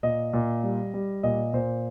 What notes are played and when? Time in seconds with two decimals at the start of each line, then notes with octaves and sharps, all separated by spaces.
0.03 A#2 D#5
0.33 A#2
0.64 G3
0.94 G3
1.23 A#2 D#5
1.53 A#2 C5